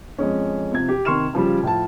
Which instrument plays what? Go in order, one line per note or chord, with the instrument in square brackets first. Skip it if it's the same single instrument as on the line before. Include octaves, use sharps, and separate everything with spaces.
[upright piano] F2 G#3 C#4
C3 F3 G#6
G4
C3 D#3 C6 C#6 F6 E7
C#3 F3 G3
A2 F3 A5